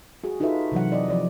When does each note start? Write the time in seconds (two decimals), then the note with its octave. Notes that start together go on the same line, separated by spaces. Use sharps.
0.24 F#4 G#4
0.40 D#4 F4 F#4 A4 B4 E5
0.72 C3 E3 F#3 F#5
0.92 D5 D#5
1.09 F3 D5